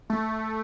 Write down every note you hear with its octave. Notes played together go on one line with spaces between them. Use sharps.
A3